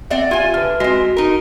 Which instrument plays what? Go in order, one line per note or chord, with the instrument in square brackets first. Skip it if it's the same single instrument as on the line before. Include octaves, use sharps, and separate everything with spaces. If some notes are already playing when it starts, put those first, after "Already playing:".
[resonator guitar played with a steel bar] C4 D5 F#5 [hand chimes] E5
[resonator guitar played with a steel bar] F4 G#5 [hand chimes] G4 E5
[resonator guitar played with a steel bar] D3 [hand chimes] B4 F6
[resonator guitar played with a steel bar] G#3 C4 [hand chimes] F#4 A#6 B6
[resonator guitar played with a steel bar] D#4 A#4